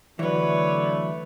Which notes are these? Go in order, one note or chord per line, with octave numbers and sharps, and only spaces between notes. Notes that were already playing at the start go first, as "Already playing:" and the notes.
D3 E3 F#3 A3 B4 C#5 D5